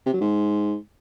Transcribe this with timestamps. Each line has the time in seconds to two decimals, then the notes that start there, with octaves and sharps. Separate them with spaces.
0.06 C3
0.13 F#3
0.21 G#2